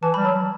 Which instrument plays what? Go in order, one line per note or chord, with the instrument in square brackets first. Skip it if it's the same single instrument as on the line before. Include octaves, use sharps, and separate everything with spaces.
[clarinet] E3 [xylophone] A5
[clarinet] G3 [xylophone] B5
[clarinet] F#3 [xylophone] A5